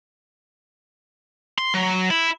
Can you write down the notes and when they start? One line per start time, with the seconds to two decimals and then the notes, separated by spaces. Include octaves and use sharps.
1.58 C6
1.74 F#3
2.10 E4